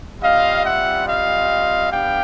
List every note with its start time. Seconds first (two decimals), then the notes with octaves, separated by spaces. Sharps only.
0.22 G3 C4 F4 D#5 F5
0.64 E5 F#5
1.06 D#5 F5
1.91 G3 B3 D4 G4 F5 G5